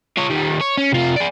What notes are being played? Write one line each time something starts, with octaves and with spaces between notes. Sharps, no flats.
F4 C#5
D#3 G3
C#5
C#4
C3 F4
G#4 D5